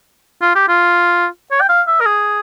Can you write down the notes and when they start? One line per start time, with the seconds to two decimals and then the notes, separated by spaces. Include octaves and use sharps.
0.42 F4
0.55 G4
0.69 F4
1.51 C#5
1.61 G5
1.69 F5
1.87 E5
2.01 A#4
2.06 G#4